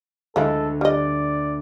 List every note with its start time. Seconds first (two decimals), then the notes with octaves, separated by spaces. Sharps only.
0.36 D2 F3 G#3 D4 E4 A4
0.81 G3 D5 D#5